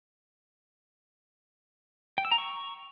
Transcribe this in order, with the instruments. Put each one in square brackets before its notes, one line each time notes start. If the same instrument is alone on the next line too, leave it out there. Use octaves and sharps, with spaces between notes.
[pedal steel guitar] G5
E6
A#5
C#6